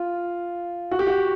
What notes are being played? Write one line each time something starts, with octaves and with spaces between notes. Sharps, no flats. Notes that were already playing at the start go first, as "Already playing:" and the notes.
Already playing: F4
F#4
G4
F#4